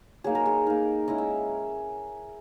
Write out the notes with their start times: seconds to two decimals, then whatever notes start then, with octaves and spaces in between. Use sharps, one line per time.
0.24 F#3 A#3 D#4 G#4
0.35 A#4
0.46 G#4
0.66 A#3 D#4 A#4
1.08 G#3 C#4 E4 D#5
1.18 E5